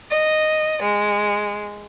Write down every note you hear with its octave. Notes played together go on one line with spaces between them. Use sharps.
D#5
G#3